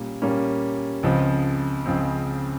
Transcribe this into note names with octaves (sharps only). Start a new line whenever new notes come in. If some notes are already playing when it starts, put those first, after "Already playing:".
Already playing: A#2 G3 A#3 C#4
A#2 G3 A#3 C#4
C#2 C#3 F3 C4
C#2 C#3 F3 C4